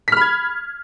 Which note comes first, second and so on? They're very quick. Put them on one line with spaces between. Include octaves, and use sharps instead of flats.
B6 F6 B5 G#6